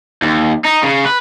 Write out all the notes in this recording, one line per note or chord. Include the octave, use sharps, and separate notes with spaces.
D#2
D#4
C#3
B4